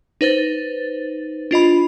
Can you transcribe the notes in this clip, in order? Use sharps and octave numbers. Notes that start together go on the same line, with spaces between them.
D#4 B4 C5 A6
D4 F4 D#5 B5